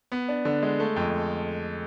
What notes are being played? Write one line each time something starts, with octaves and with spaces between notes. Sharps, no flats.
B3
D4
D3
G#3
A3
F2